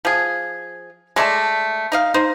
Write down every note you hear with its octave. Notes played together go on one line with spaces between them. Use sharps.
F3 G#4
G#3 A3 D5 A5
D#4 D#5 F5
D#4 C5